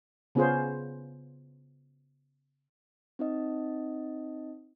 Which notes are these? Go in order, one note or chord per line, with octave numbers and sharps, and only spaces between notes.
C#3 B3 C#4 F4 G#4 C5
C4 D#4 D#5